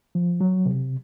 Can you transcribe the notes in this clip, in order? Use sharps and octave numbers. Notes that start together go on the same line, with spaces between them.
F3
F#3
C3